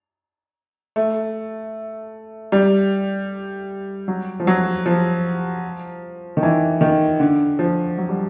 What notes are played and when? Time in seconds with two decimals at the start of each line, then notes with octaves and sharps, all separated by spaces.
0.96 A3
2.52 G3
4.08 F#3
4.40 F3
4.47 F#3
4.86 F3
6.37 D#3
6.43 E3
6.81 D#3
7.20 D3
7.59 F3
7.98 F#3
8.09 G3